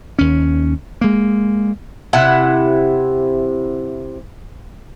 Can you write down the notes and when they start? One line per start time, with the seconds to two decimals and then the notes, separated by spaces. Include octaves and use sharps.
0.19 D#2 C#4
1.01 G#3 A#3
2.13 C3 E4 F#5